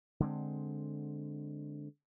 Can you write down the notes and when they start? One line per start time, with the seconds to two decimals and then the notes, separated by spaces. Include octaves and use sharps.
0.20 D3 G#3 C4